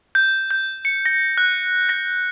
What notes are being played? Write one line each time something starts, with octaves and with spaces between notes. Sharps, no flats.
G6
G6
C#7
A#6
F#6
A#6